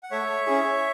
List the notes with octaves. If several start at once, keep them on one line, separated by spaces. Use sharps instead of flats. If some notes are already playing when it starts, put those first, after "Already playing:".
F#5
A3 C#5 E5
C#4 E4 G#4